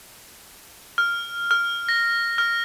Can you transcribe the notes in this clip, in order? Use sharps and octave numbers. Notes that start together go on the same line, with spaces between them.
F6
F6
A#6
F6